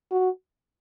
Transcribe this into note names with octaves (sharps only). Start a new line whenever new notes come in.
F#4